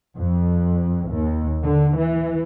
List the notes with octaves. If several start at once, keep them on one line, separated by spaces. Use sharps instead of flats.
F2
D#2
D3
E3